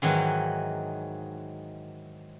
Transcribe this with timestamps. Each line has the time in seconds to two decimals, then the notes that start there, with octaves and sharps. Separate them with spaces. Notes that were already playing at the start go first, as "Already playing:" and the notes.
0.02 G#2 D#3 E3 F#3